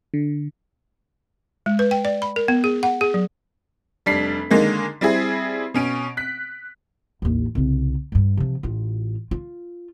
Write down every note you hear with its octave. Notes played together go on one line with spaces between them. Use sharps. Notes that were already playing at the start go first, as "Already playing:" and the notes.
D3
G#3
B4
G5
D5
B5
A#4
B3
G#4
F#5
G#4
F#3
F1 G3 D4 B6 C7
D3 D#3 G#3 A#3
G3 C4 E4 G#4
B2 C#4 D7
F#6 B6
A1 D#2
C2 C#3
G2 G3
C3 F3
A1 F4
F4